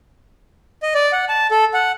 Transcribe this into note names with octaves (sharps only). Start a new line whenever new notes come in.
D#5
D5
F#5
A5
A4
F#5